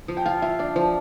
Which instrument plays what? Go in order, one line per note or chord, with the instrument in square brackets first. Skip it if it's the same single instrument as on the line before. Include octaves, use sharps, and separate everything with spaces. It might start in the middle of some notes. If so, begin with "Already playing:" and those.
[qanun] F3
[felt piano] G5
[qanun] F4 [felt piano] F5
[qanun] F4 [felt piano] E5
[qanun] D4 [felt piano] D5
[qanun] F3 [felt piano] C5